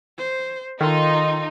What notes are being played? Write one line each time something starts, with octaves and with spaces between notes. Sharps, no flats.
C5
D#3 D#4 F4 A4 C6